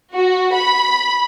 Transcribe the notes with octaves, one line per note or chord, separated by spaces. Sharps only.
F#4
B5